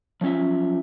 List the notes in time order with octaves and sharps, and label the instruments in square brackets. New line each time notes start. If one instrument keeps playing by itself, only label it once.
[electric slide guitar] F3 F#3 C#4 F4 E5